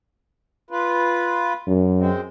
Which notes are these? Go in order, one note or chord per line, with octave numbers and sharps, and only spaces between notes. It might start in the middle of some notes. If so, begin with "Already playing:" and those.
F4 B4
F#2
G#3 C4